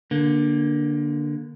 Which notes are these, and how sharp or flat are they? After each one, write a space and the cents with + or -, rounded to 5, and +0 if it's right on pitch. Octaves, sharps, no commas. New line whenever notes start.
D3 +0 A#3 +20